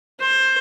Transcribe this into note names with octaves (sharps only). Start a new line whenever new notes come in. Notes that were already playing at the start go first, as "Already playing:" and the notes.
C5